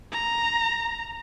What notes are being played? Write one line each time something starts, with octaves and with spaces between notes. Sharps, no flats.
A#5